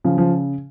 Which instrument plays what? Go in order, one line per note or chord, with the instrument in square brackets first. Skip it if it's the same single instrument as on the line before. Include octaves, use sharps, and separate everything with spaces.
[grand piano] C#3 [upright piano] F3
[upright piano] F3